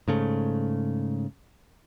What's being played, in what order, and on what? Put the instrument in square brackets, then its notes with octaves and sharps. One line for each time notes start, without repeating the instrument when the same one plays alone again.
[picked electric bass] G#2 C#3 A3